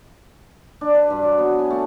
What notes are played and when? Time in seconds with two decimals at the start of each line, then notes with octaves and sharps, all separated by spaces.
0.81 D4
0.94 B4
1.10 G2
1.23 F#3
1.38 B3
1.59 G#5
1.70 A3